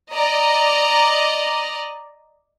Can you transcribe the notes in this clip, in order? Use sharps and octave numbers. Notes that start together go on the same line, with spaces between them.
D5 D#5 A#5